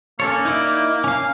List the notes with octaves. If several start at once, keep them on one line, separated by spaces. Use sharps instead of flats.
A#3 C#4 A4 C#5
D#4 E4 D5
C#4 F5